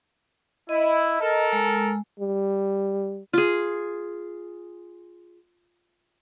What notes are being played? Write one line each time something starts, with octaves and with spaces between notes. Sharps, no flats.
E4 D#5
A4 A#4
G#3
G3
F4 G#4